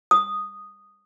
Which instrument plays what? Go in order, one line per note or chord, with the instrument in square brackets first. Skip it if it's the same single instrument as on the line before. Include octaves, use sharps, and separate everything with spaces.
[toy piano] D#6